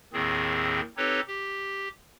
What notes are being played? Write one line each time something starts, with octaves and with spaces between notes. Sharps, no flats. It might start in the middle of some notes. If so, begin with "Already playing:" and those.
D#2 A2 D#3 C4 G#4
C4 D#4 G4 A4 B4 C#5
G4